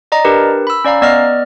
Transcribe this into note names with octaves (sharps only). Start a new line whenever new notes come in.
D5 D#5 A#5
D4 G4 A#4 B4
B5 E6
C#4 D5 F5 A#5
B3 D5 D#5 F6